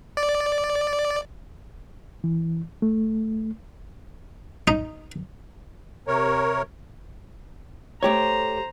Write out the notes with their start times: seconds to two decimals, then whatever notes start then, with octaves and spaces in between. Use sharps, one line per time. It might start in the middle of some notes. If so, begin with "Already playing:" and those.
0.17 D5
2.24 E3
2.82 A3
4.68 D#4
6.07 C3 A#4 C#5
8.03 A3 G4 C5 C#5 A#5